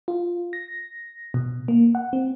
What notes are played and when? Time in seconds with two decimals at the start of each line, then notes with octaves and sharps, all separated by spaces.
0.08 F4
0.53 A#6
1.34 B2
1.68 A#3
1.95 F#5
2.13 C4